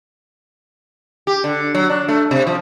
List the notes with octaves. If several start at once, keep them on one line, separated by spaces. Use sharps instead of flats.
G4
D3
F#3
D4
A3
C3
F3